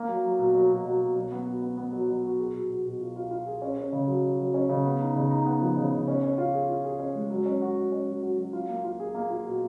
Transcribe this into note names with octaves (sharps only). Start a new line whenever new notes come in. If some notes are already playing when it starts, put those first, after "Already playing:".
Already playing: A#3
F#3
F#3
B2
F#3
B2
F#3
B2
F#3
B3
F#4
B3
B3
F#3
F#3
F#4
G#4
B2
B2
B2
F4
F4
F4
G#4
C#4
C#4
C#3
F#3
F#3
F#3
C#4
C#3
B3
D#4
C#3
D#4
B3
F3
C#3
C#3
C#4
C#4
F4
G#4
F4
G#4
C#4
G#3
F#3
C#4
F#4
F#3
C#4
F#3
F#4
F#3
F4
A#3
F4
G#4
A#3
F4
B2